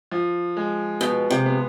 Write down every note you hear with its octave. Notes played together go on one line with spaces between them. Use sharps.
F3
G#3
B2 B3
C3
B3